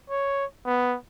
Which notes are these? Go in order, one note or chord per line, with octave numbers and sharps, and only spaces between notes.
C#5
B3